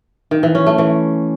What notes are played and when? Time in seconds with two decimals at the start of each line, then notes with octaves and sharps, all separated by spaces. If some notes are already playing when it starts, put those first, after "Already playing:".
0.31 D#3
0.43 E3
0.55 C#4
0.66 A3
0.78 E3